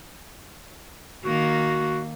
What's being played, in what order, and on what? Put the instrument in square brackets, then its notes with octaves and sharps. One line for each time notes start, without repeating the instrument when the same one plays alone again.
[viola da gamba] D#3 A#3 [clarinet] F#4